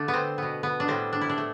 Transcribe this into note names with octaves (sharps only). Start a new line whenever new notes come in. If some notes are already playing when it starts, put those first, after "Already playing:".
Already playing: D3 A3 D4
B3
C4
B2 B3
B3
D4
A2 G3 B3 C4
D4
E4
D4
A3